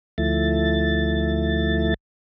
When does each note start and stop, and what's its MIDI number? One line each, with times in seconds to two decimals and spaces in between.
0.18 1.94 38
0.18 1.94 53
0.18 1.94 57
0.18 1.94 64
0.18 1.94 93